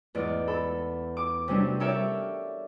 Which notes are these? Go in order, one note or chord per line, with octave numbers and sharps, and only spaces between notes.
E2 G#2 D5
A4 B5
D6
C3 F#3 G3 C#4 D4
G4 A4 A#4 C#5 D5 E5